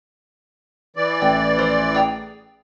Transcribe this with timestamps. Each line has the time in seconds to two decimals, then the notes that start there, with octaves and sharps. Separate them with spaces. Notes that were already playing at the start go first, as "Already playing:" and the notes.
0.96 E3 D5
1.22 A1 G5
1.59 F3 C5
1.95 G#4 G5 A#5